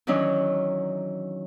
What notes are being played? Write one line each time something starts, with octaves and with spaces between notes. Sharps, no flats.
D#3 E3 F#3 C#4 D4 D#5